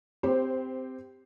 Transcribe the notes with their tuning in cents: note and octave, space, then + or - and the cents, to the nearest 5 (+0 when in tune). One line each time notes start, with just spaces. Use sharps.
C4 -15 G4 +10 C5 +0